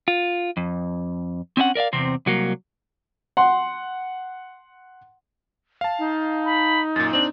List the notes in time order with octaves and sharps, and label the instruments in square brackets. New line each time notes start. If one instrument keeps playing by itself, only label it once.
[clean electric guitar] F4
F2
C4 C#4 E4 F#5
A#4 D5 E5 F5
E2 C3 C4
C2 F#3 A#3
[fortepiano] F#5 C6
[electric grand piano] F5 A5
[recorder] D#4
[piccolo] B5
[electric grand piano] F#2 A#2 [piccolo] A6
[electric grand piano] C4 D4 [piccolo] F#7